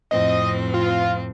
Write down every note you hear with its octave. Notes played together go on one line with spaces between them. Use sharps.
F2 A2 C4 D#5
F4